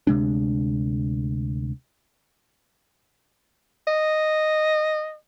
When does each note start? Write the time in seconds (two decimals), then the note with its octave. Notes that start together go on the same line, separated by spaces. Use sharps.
0.07 D2 C3 G#3 D4
3.87 D#5